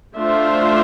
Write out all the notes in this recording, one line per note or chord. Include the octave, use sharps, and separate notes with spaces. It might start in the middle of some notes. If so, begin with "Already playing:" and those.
A3 D4 F4 C5 E5